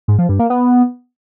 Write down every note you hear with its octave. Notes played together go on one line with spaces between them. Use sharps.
G#2
F3
G2
A#3
B3